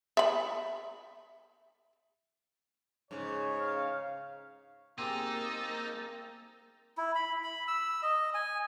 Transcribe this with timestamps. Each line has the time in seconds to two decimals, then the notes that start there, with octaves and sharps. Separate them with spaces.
0.17 E5 B5
3.11 G#2 C#3 C#5
3.61 F5
4.98 A#3 C4 D#4 G4 G#4 E6 A6
6.98 E4
7.15 B5
7.44 B5
7.68 E6
8.03 D#5
8.34 G#5